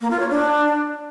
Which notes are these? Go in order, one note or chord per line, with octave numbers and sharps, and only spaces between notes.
A#3
F4
C#5
D4